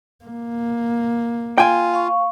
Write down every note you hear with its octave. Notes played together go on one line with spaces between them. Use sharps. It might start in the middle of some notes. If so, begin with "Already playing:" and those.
A#3
F4 G5 G#5
F5 C#6